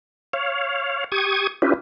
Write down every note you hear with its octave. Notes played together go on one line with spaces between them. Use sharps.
C#5 F5
G4 C#6 D#6 G#6
C#4 D4 E4 F4 G4 B4